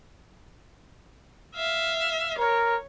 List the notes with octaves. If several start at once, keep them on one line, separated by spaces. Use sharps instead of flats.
E5 F5
A#4 C#5